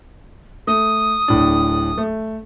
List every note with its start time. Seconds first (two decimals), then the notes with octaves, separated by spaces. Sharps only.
0.67 A3 D#6
1.28 D1 A2 D4
1.98 A3